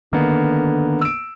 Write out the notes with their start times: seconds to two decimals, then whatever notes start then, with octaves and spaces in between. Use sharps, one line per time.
0.13 D3 D#3 A#3 B3
1.01 E6 D7